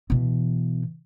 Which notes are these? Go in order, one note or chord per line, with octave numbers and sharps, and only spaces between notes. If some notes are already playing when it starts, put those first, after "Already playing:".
B2 E3